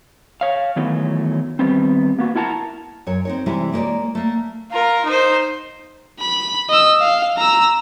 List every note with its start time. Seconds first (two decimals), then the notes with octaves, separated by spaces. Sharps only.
0.41 C#5 F5
0.76 D#3 E3 F#3 A3 B3
1.59 D#3 E3 G3 B3 C4
2.19 A#3 B3 F#4
2.35 E4 A#4 F#5 A5 A#5
3.07 F#2 C#5
3.25 C4 D#4 C#5
3.46 C3 E3 G3 G#3 E4
3.72 G#3 A#3 A#4 C#5 D5
4.15 A3 A#3
4.72 F4 A#4
5.05 D#4 C5
6.20 B5
6.70 D#5 E6
7.00 F5
7.38 A#5 E6